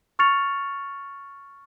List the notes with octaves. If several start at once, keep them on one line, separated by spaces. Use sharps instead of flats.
C#6 F6 A6 C#7 F7